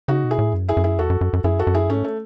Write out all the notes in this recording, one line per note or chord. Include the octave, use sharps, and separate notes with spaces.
C#3 D#4 F#4
B2
E4 G#4
A2
F#2
E4 G#4
F#2
E4 G#4
E2 F#4 A4
F#2
F#2
F#2
F#2 E4 G#4
F#4 A4
F#2
E4 G#4
G#2 A3 C#4
A3